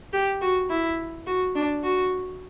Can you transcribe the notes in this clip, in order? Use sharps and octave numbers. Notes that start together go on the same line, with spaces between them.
G4
F#4
E4
F#4
D4
F#4